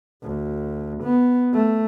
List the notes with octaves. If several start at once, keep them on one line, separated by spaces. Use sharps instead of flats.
D2
B3
A3